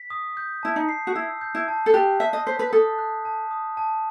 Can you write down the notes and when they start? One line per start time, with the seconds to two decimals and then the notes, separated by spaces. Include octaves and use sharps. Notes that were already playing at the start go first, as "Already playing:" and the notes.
Already playing: B6
0.10 D#6
0.37 G6
0.63 E4 A5
0.76 D#4
0.89 C7
1.07 F#4
1.15 E4 E6
1.41 G6
1.55 E4
1.68 A5
1.86 A4
1.94 G4 F#6
2.20 E5 A5
2.33 D#5
2.46 C5 B6
2.59 B4
2.73 A4 D#6
2.98 F#6
3.25 A5
3.51 D#6
3.77 A5